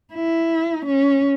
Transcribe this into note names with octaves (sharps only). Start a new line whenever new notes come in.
E4
C#4